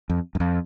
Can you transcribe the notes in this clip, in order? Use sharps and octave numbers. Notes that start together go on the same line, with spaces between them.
F2
F#2
F2